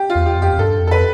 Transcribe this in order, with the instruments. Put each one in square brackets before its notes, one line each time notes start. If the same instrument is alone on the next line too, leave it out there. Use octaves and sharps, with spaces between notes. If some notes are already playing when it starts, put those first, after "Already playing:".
Already playing: [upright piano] G4
F4
[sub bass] E2
[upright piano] G4
[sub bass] F2
[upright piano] G4
[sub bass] F2
[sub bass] G2 [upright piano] A4
[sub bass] F2
[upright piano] A4
B4